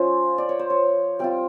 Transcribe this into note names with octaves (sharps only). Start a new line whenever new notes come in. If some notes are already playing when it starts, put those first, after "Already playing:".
Already playing: F3 C#4 F4 C5
D5
C#5
C5
C#5
G3 C4 F4 G5